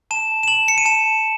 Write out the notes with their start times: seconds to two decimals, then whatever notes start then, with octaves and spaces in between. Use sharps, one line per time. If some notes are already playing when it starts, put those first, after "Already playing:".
0.11 A5 E7
0.43 E7
0.48 A5 F#7
0.68 C#7
0.78 D#7
0.85 A5 E7